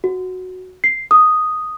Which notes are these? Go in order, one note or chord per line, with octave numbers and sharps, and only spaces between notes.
F#4
C7
D#6